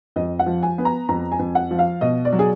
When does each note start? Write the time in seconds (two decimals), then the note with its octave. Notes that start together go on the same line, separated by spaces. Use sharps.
0.16 F2 D#5
0.39 F#5
0.46 F3
0.63 G#5
0.78 B3
0.85 A#5
1.09 F2 A#5
1.32 G#5
1.39 F2
1.55 F#5
1.71 F3
1.79 F5
2.01 B2 D#5
2.25 D5
2.32 F#3
2.39 G#4